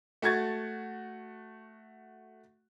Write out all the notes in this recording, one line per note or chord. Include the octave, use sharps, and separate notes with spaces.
A3 F#4 C#6 G#6 A6